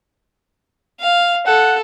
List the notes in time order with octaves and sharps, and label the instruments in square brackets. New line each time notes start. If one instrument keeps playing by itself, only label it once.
[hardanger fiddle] F5
[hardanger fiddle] A4 [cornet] F#5